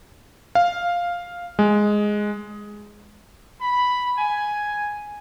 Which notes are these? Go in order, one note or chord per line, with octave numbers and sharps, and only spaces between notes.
F5
G#3
B5
G#5